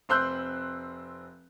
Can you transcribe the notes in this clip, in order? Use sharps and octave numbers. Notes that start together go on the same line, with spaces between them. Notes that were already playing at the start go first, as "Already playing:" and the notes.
F1 C4 C6 E6 F#6 G6